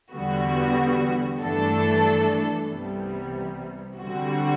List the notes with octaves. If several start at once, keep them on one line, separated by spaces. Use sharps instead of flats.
E2 D3 G3 B3 F#4
G2 E3 A3 D4 A4
C2 C3 E3 G3 B3
D3 G3 C4 F#4